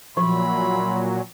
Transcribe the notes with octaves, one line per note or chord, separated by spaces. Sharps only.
A#2 F3 F#3 E5 B5 C6